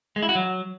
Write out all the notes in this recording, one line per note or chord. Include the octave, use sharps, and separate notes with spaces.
G#3
E4
F#4
F#3